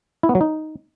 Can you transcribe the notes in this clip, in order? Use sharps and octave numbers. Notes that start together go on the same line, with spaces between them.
E4
B3
F#3
D#4